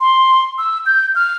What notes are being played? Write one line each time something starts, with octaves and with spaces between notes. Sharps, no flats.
C6
E6
G6
F6